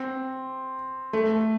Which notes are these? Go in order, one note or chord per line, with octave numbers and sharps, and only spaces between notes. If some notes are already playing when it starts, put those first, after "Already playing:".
Already playing: C4
A3